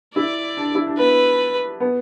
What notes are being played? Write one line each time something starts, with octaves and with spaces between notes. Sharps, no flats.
E4 D5
D4
E4
D4
B3 B4
B3